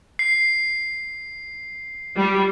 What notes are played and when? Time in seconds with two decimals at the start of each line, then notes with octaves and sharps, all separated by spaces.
0.19 C7
2.16 G3